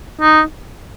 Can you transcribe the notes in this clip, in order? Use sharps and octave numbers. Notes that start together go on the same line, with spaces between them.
D#4